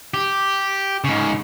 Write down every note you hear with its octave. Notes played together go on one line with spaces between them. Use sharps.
G4
G#2 C#3